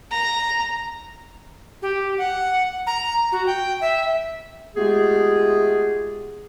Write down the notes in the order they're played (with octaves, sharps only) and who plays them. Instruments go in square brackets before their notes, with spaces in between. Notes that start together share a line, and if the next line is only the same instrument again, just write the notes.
[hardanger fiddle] A#5
[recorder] G4
F#5
A#5
F#4
G5
E5
[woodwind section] G#3 A3 B3 F4 G4 G#4